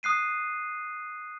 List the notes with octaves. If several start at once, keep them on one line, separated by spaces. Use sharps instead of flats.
D#6 F#6 C7 D#7